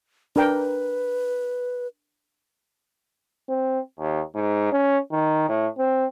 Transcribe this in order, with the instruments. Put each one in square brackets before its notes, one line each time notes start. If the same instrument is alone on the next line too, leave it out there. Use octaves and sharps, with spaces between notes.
[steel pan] D4 A#4 G5 [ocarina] B4
[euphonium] C4
D#2
G#2
C#4
D#3
A2
C4